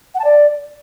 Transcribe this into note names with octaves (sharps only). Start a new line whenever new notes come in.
F#5
A5
D5